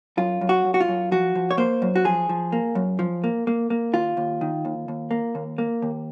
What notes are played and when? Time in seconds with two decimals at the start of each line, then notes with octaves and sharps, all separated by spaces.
0.17 F#2 F4
0.41 F#2
0.49 F#4
0.65 F#2
0.74 F#4
0.80 F4
0.88 F#2
1.12 F3 F#4
1.35 F3
1.51 C#5
1.57 A#3 C5
1.82 F#2
1.95 F#4
2.05 F3 G#4
2.29 F3
2.52 A#3
2.75 F#2
2.99 F3
3.24 A#3
3.47 A#3
3.70 A#3
3.93 D#2 F4
4.17 D#2
4.41 D#3
4.65 D#2
4.88 D#2
5.11 A#3
5.35 D#2
5.58 A#3
5.82 D#2